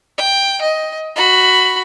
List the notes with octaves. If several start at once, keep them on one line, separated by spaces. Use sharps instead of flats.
G5
D#5
F#4 B5